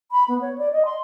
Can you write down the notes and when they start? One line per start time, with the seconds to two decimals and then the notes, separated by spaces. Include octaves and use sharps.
0.11 B5
0.28 B3
0.41 C#5
0.58 D5
0.72 D#5
0.85 C6